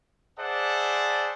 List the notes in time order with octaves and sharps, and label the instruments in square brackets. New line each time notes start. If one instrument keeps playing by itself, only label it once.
[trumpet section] G#4 C5 D5 E5 F#5 A5